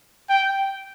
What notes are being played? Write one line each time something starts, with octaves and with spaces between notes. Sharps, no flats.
G5